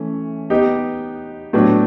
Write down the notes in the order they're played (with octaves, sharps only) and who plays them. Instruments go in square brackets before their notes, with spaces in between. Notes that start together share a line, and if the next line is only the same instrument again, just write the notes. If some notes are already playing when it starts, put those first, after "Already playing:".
Already playing: [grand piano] E3 A3 C#4
B3 D#4 G4
A2 F#3 B3 D4